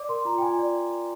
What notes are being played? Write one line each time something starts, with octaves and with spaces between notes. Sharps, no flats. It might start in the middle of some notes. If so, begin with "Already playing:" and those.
Already playing: D5 D6
A#4 C6
F4 A#5
G5
F4 G#5
D5